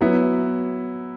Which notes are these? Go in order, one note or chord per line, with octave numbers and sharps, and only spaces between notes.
F#3 B3 E4